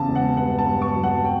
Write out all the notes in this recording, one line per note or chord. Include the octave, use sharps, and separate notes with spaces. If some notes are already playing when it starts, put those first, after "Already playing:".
Already playing: E2 C#3 A5
E1
F#5
G2 F#5
A5
G2
C#6
F#3
F#5
G5